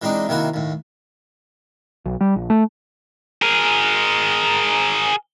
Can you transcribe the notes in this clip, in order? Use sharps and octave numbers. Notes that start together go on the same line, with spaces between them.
E3 G#3 C4 D4 D#4
C3 D#3 A#3 E4 F#4
D#2 A2
B1
G3
A#1
A3
G#4 A#4